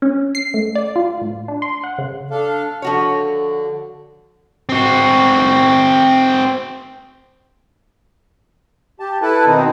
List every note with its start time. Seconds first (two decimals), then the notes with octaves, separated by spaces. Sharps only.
0.02 C#4
0.35 C7
0.54 A3
0.75 D5
0.96 F4
1.22 A2
1.48 D4
1.62 C6
1.84 F#5
1.98 C#3
2.31 D4 A4 F5
2.82 D3 F3 F#4 C#5
4.69 C4 F#4
9.00 G4 A5
9.22 E4 A4 B4 A5
9.46 B2 D#3 C4 D#4